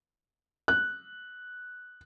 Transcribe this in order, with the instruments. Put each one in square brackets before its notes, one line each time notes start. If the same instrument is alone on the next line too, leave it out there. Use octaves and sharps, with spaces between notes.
[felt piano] F#6